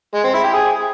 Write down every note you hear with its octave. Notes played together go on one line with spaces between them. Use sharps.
G#3
C4
E4
G4
G#4